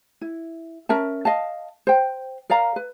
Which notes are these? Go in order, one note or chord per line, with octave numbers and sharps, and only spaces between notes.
E4
C#4 A#4 E5 A5
D#5 F5 A5
C5 G5
A#4 D5 F5 A#5
B4